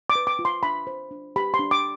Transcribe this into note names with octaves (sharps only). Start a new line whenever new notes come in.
D6
B4
D6
F4
C6
D4 B5
C5
D4
G4 B5
C6
D4
D6